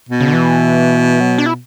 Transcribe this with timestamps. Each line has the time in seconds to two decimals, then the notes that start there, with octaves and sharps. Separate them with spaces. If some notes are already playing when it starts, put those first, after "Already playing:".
0.09 B2
0.20 C#3
0.28 D3
0.33 E3
1.20 F#3
1.38 D4
1.46 E4